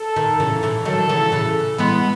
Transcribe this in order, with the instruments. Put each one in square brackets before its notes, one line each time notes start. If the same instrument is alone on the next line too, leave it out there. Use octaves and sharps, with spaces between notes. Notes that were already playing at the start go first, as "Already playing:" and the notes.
Already playing: [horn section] A4
[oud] D#3
C#3 E3
C#3 E3
[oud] D#3 F#3 [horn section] A4
[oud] C#3 E3
C#3 E3
[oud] E3 G#3 [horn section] B3